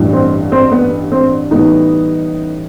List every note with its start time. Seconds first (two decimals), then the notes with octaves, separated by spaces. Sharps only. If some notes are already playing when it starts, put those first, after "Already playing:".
Already playing: A1 G2 E3 G3
0.13 C4
0.52 C4
0.72 B3
1.12 C4
1.51 A1 A2 E3 G3 B3 D#4